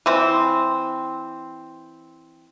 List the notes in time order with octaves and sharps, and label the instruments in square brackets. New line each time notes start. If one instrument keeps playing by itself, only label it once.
[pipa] E3 C4